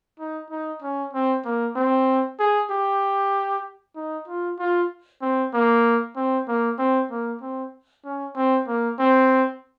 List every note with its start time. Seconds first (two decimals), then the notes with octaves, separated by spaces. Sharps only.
0.19 D#4
0.51 D#4
0.82 C#4
1.13 C4
1.45 A#3
1.76 C4
2.39 G#4
2.71 G4
3.96 D#4
4.28 F4
4.59 F4
5.22 C4
5.53 A#3
6.16 C4
6.48 A#3
6.78 C4
7.11 A#3
7.41 C4
8.04 C#4
8.36 C4
8.67 A#3
8.99 C4